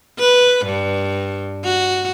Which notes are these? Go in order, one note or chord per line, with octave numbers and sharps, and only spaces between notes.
B4
G2
F#4